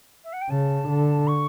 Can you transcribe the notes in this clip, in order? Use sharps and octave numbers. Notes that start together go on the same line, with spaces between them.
E5
F#5
G5
C#3 A5
D3
C#6